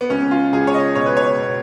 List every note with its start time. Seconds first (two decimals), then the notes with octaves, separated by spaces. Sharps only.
0.01 B3
0.10 C#2 C#4
0.31 F4
0.53 C#2 G#4
0.67 C#5
0.74 D#5
0.95 B2 C#5
1.06 B4
1.17 C#5
1.38 B2